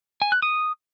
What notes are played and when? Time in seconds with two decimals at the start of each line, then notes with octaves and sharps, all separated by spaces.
0.22 G#5
0.32 F#6
0.42 D#6